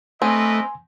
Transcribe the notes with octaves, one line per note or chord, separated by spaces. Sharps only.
A3 C4 A#4 B4 D#5 G#5 C6